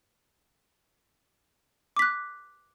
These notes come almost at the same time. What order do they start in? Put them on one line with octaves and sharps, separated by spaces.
D6 B6 F#6